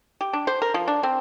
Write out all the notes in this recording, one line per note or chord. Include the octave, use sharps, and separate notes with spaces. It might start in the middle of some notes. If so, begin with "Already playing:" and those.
G4
D4
C5
A#4
F3
D4
C4